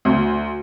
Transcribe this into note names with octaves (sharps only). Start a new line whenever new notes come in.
D2